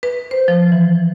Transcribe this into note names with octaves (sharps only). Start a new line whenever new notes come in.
B4
C5
F3
E3